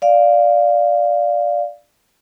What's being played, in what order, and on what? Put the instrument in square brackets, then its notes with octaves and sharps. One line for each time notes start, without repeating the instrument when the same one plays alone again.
[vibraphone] D5 F5